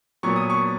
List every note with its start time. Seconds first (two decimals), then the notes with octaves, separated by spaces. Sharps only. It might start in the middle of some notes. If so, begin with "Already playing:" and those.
0.23 A#2 F#3 B3 C#6
0.36 D#6
0.50 C#6